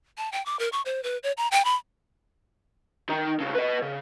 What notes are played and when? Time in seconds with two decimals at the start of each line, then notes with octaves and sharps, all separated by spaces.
0.18 A5
0.32 G5
0.46 D6
0.59 A#4
0.72 C#6
0.86 C5
1.03 B4
1.23 C#5
1.37 A#5
1.51 G5
1.65 B5
3.09 D#3 D#4
3.40 B1 C#3
3.55 B4 D#5
3.82 C#3